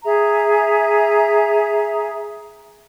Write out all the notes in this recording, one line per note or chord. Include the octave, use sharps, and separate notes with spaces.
G#4 E5 A#5